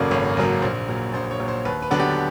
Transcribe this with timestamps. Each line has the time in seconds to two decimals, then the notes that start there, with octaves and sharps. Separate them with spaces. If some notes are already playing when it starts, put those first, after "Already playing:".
Already playing: G#1 F#2 C#3 F#3 A#3 G#4 A4 D5
0.11 G#1 C#5
0.37 F#2 C#3 F#3 A#3
0.62 A#1 C5
0.88 A#2 F#3
1.13 A#1 C5
1.31 C#5
1.40 A#2 F#3
1.48 C5
1.65 D#2 B4
1.82 B4
1.91 D3 F#3 B3 D4
2.00 G4